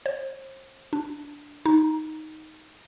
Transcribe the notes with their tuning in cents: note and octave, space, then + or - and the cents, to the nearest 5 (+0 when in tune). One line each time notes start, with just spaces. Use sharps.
C5 +35
D4 -5
D#4 +5